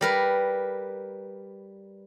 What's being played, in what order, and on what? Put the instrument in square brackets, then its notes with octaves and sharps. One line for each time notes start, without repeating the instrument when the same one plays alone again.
[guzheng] G3 A#4 B4